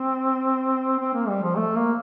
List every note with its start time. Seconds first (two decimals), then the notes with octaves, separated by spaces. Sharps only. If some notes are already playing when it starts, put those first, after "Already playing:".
Already playing: C4
1.00 C4
1.14 A#3
1.28 G3
1.43 F3
1.57 A3
1.76 A#3